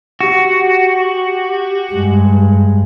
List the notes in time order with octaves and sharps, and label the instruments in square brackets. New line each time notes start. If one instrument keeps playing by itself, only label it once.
[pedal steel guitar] F#4 [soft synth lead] G4
[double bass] G2 G#3